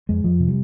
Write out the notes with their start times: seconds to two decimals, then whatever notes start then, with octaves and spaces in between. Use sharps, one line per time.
0.09 F2 G#3
0.24 F2 F3
0.40 C3
0.48 G3